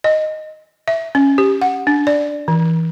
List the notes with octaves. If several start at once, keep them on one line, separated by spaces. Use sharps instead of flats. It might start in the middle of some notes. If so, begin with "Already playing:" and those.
D#5
E5
C#4
G4
F#5
D4
D5
E3